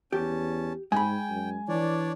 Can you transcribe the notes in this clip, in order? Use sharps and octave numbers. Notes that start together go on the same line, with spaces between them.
E2 C#4 G4 A5
G#2 G#3 G5 G#5 B5
F#2
E3 D4 C#5 D5